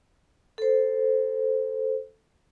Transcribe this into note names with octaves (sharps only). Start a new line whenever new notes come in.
A4 C5